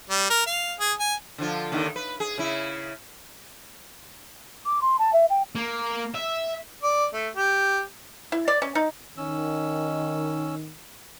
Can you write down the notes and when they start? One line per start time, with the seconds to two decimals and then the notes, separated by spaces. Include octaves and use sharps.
0.10 G3
0.30 A#4
0.46 F5
0.79 G#4
0.99 G#5
1.38 D3 F3 F4
1.72 D#2 D3 D#3
1.96 B4
2.20 G#4
2.38 C#3 E4
4.65 D6
4.81 C6
4.99 A5
5.13 E5
5.30 G5
5.55 A#3
6.14 E5
6.83 D5
7.14 A3
7.36 G4
8.32 E4
8.48 D5
8.62 C#4
8.75 D#4
9.17 D#3 C#4 E6